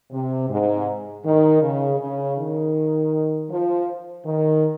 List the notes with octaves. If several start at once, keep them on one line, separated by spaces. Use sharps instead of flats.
C3
G#2
D#3
C#3
C#3
D#3
F3
D#3